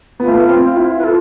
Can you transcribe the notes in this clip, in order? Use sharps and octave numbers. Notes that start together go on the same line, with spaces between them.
B3 F4
A3
B3
C4
E4
B4
F4 A4